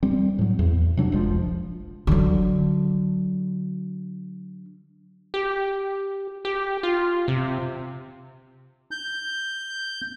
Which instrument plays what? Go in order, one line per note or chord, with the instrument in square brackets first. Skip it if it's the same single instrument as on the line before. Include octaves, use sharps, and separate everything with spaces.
[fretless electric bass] G3 C4
A2 F#3
E2
C3 F#3 D4
E1 A#1 F3 G#3
[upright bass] D3 F#3
[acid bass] G4
G4
F4
C3
[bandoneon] G6